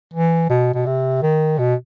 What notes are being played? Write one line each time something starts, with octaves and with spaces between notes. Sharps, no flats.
E3
B2
B2
C3
D#3
B2